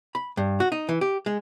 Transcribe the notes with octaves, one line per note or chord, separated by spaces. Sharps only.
B5
G2
F#4
D#4
E3
G4
G#3